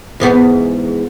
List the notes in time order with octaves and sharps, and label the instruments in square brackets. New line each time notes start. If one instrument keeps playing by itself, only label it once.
[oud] E2 G#2 B3